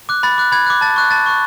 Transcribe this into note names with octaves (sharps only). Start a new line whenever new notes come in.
D6 F#6
B5 A6
D6 F#6
B5 G#6
D6 F#6
A5 A6
C#6 F#6
A5 A6
C#6 F#6